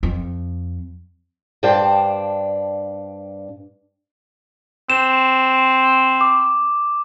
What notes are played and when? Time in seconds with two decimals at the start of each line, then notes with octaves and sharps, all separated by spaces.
0.03 F2
1.63 G2 D4 C5 F5 G5 A5
4.90 C4 E7
6.21 D6